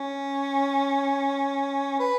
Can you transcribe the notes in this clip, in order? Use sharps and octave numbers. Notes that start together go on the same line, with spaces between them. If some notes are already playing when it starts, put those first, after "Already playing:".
Already playing: C#4
B4